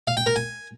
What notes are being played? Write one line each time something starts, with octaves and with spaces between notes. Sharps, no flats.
F5
G5
A#4
G#5